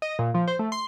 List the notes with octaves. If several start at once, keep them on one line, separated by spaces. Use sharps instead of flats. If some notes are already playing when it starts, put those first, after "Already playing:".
D#5
A#2
F3
C5
A3
C6